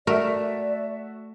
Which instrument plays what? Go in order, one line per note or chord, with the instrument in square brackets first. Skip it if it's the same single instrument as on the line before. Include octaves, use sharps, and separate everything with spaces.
[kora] A3 [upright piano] F#4 E5 [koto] A#4 [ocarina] D5